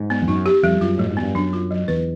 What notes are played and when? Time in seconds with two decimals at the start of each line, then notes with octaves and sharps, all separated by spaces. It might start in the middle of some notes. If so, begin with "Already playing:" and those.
Already playing: G#2
0.10 B3
0.22 F2
0.28 F#2 D#4
0.46 G4
0.63 F2 G3
0.81 F#2 F4
0.98 A2 F#3
1.11 G#2
1.17 B3
1.23 G2
1.35 F#2 D4
1.53 F4
1.71 F#3
1.88 E2 B4